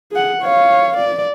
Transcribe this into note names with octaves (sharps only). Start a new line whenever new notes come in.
G#4 F#5
C#5 F5
D5